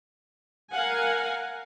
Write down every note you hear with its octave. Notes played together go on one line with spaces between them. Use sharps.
A#4 F5 F#5 G#5